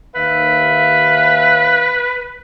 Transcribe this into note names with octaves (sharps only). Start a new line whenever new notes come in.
D#2 B4 E5 F5